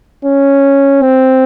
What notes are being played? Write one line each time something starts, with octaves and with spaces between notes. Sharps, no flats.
C#4
C4